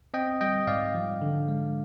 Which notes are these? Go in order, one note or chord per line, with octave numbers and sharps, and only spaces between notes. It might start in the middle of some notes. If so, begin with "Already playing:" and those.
C4 D#5 G5
G3 D#5 G5
G#2 D5 F5
F3
D3
G#3